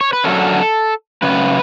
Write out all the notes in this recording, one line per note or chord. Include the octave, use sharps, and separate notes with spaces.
C#5
B4
F#2 D3 F#3 A3 C#4 A4
F#2 C#3 B4